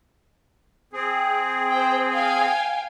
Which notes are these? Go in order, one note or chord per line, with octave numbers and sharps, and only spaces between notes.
C4 G#4
C5 G5
F5 G5 G#5